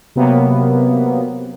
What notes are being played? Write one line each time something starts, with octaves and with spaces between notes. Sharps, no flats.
C3 F#3 A#3 B3